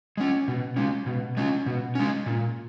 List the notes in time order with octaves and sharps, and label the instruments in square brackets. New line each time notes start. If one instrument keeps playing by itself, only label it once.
[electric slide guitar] G#3 C#4
B2
G#3 C#4
B2
G#3 C#4
B2
G#3 C#4
A#2